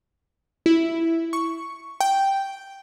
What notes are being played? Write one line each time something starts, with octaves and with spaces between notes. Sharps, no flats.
E4
C#6
G5